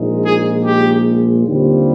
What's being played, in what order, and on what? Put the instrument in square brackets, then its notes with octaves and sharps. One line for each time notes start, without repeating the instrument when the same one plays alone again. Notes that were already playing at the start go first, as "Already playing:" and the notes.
Already playing: [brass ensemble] A#1 A#2 G#3 D#4
G#4
G4
D#2 D3 G3 C4 F4